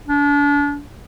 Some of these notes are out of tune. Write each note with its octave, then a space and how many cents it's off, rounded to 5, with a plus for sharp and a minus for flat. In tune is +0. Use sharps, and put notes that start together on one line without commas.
D4 -35